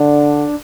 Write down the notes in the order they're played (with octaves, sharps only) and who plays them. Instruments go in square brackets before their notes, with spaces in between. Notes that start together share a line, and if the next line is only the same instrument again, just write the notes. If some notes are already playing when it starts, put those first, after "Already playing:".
Already playing: [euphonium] D3 [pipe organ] D4